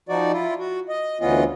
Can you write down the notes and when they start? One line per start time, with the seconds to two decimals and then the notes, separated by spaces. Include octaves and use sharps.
0.09 F3 D#4 F#4 D5
0.32 E4 F4
0.59 F#4
0.89 D#5
1.21 D2 E3 B3 C#4 F4 D#5